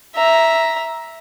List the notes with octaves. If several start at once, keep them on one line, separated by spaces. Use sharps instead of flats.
E5 A#5